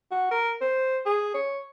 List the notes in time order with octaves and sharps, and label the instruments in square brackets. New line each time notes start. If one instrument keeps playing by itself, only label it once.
[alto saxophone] F#4
A#4
C5
G#4
C#5